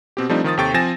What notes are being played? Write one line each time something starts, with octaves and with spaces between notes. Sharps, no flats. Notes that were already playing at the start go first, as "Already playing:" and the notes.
B2 C4 G4
F3 G3 A3 C4 D4 D#4
D#3 F3 D#6 A6
D#2 C3 A4 G5 C#6 A6
F3 C4 G#5 A6 A#6 E7